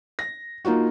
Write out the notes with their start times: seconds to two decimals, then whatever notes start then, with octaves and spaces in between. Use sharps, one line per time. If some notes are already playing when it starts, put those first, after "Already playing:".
0.19 A#6
0.65 A#3 D#4 F4 F#4